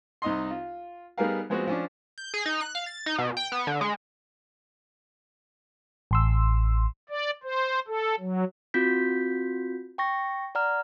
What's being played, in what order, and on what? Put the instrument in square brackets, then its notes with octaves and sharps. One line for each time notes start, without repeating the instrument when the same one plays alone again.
[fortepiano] C2 D#4 D#5 C6
F4
G3 B3 D#4 G#4 A#4 F5
F3 G#3 B3 C4 F#4
F3 C#4 D4
[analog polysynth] G6
G#4
D#4
F#6
F5
A6
D#4
B2
G5
B3
D3
G#3
[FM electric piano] A1 C6 E6
[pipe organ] D5
C5
A4
F#3
[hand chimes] C4 F4 F#4 G6 B6
G5 C#6 A#6
D5 F#5 A#5 F6